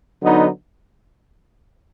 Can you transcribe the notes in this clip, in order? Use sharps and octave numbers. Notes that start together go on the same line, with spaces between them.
D3 F#3 B3 D#4